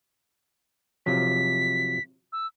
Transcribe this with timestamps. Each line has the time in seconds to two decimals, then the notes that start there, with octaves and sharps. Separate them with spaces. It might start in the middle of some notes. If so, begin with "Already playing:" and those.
1.06 C3 F3 F#3 B6
2.33 E6